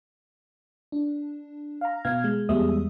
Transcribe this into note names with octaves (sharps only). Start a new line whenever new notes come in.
D4
F5 A#5
B2 B3 F5 F6 G#6
G#3
E2 G3 G#3 B3 E5 D#6